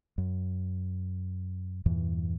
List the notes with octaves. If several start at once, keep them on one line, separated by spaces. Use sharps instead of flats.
F#2
E2 G2 A#2 E3